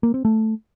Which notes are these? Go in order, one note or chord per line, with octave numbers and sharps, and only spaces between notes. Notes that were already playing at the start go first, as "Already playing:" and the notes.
A#3
C4
A3